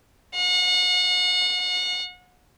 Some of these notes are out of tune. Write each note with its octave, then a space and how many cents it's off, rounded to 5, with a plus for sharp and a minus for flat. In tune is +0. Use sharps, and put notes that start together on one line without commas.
F#5 -35